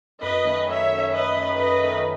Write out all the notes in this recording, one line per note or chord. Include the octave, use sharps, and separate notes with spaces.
F#2 B4 D#5
D#3 A3 C#4
F#2 C#5 E5
D#3 A3 C#4
F#2 B4 D#5
D#3 A3 C#4
F#2 B4 D#5
D#3 A3 C#4